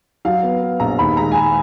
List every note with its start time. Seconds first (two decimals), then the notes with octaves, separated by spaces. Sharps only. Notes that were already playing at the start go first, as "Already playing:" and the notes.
0.25 F#3 F5
0.43 B3
0.61 B3
0.80 A#1 A#5
0.99 D#2 B5
1.17 G#3 A#5
1.31 G#5
1.35 G#3 A#5